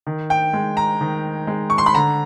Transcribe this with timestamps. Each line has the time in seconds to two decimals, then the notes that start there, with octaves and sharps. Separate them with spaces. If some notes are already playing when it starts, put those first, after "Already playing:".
0.07 D#3
0.30 G5
0.53 G#3
0.77 A#5
1.01 D#3
1.47 G#3
1.70 C#6
1.78 C6
1.86 B5
1.95 D3 A#5